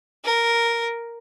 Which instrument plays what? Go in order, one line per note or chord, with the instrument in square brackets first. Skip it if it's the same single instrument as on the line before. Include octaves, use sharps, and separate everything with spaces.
[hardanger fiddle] A#4